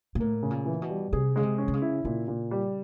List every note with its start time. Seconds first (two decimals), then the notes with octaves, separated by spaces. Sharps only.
0.15 A#2
0.20 A2 A#3
0.43 C#3
0.51 A#2
0.66 E3
0.82 B2
0.89 G3
1.13 C3 G#4
1.36 C#3 G#3
1.43 C3
1.58 C#4
1.68 C3
1.73 C#3
1.82 E4
2.05 A#2 C#3
2.28 A#2
2.51 G3